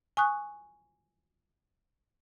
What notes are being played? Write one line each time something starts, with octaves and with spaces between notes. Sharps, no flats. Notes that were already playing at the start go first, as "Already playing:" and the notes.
G#5 C#6 D#6 F#6